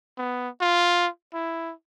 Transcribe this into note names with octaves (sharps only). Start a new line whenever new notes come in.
B3
F4
E4